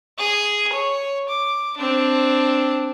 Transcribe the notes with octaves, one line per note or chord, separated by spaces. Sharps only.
G#4
C#5
D6
C4 D4